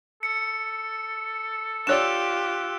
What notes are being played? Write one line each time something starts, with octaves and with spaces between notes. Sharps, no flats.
A4 C#7
D4 F4 G4 C#5 D5 E6 F#6 E7